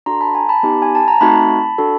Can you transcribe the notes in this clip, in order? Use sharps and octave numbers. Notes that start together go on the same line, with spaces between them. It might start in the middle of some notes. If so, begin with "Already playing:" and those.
D4 F#4 A4 A#5 C6
A5 B5
G#5 A#5
A5 B5
B3 D#4 G4
G#5
A5
A#5
A3 C4 D#4 F#4 A5 B5
D4 F#4 A4